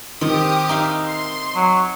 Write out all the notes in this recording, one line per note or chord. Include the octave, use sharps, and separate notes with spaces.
D#3 C4 G4 D6 D#6
D#4 E5 F5
C6
F#3